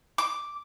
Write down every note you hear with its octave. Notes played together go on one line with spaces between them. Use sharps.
D6